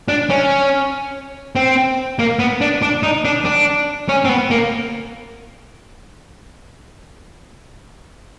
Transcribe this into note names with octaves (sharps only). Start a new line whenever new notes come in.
D4
C#4
C4
A#3
B3
D4
D4
D#4
D4
D4
C#4
C4
B3
A#3